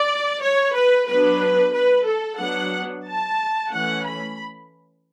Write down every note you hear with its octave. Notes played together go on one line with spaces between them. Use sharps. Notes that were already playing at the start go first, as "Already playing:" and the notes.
Already playing: D5
C#5
B4
F#3 B3 D4 B4
B4
A4
F#3 B3 D4 F#5
A5
E3 A3 C#4 F#5
B5